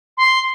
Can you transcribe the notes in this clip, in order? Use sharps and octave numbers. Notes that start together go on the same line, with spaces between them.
C6